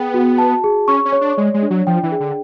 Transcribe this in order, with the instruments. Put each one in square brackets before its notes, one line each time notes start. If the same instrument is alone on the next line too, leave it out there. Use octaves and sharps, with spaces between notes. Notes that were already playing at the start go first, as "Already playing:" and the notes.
Already playing: [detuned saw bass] B3 [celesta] G#4 G5
[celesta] F#4
A5
G#4
[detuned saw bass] C#4 [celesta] C#6
[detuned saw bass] C#4
[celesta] C#5
[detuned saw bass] D4
[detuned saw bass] G#3 [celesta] D5
[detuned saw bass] G#3
[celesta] D4
[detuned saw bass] F#3
[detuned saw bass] F3 [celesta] G5
[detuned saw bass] E3
[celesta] G#4
[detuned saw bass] D3